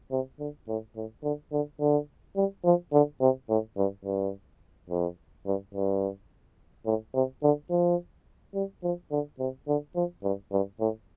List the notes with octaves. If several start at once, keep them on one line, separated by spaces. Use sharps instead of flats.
C3
D3
A2
A2
D3
D3
D3
G3
F3
D3
C3
A2
G2
G2
F2
G2
G2
A2
C3
D3
F3
G3
F3
D3
C3
D3
F3
G2
G2
A2